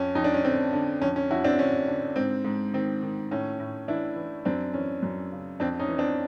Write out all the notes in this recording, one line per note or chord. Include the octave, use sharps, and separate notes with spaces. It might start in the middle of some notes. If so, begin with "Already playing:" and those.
Already playing: F2 C#4
F2 D#4
D4
C#4
D3 C4
D3
F2 C#4
C#4
F2 E4 F#4
C4 D4
D3 C#4
D3
G#2 C4
G#2
D#3 C4
D#3
A2 C#4
A2
E3 D4 E4
E3
F#2 C4 D4
E3 C#4
F#2
C#3
F2 C4 D4
C#4 D#4
E3
C4 D4